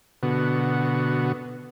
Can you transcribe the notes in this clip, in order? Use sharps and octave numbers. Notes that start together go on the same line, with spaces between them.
B2 D3 B3 F#4